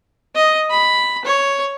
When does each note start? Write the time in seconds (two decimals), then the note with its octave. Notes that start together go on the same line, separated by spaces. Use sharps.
0.35 D#5
0.70 B5
1.25 C#5